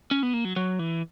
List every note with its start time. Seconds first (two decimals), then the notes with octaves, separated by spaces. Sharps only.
0.11 C#4
0.23 B3
0.34 A#3
0.45 F#3
0.56 F#3
0.79 E3